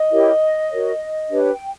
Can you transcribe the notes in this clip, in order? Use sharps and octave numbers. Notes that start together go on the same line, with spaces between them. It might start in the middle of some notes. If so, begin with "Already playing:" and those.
Already playing: D#5
E4 G4 A#4 C#5
F#4 A#4 C#5
D4 G4 B4 C#5
G5